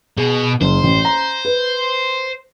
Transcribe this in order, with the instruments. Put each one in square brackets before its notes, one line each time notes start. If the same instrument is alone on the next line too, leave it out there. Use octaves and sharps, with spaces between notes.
[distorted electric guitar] B2 [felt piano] G#4
[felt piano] F#1 [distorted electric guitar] C5
[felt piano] A1
A#5
B4